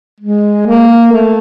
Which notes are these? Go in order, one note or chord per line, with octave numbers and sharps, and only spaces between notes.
G#3
A#3
A3